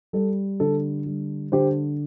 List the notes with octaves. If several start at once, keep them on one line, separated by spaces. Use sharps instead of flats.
G3 A4
D3 A4
G3
D3 G4 C5